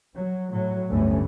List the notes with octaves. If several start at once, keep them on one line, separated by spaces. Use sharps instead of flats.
F#3
A2 F#3
G1 D2 A2 E3 A3 C#4